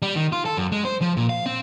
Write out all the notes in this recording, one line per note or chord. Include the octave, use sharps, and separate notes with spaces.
G3
D#3
F4
A4
F#2
G#3
C5
F3
A#2
F5
C4